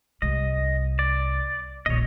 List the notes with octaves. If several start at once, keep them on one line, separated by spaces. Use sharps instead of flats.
C2 D#5
D5
D#1 A#1 C#5 D#5